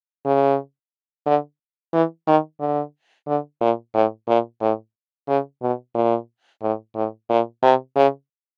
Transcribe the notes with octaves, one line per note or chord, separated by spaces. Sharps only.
C#3
D3
E3
D#3
D3
D3
A#2
A2
A#2
A2
C#3
B2
A#2
A2
A2
A#2
C3
C#3